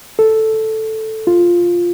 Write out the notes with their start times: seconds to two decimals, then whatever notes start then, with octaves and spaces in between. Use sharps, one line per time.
0.19 A4
1.27 F4